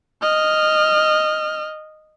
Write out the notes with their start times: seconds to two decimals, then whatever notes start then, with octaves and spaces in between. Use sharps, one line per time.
0.22 D#5 F6